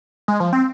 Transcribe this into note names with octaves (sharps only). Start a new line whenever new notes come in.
G#3
F3
C4